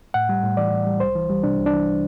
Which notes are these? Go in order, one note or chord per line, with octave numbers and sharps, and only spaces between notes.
A2 F#5
G3
A2
E3 D5
A2
G3
C2 C5
E3
G3
C3 D4
C2
D4
E3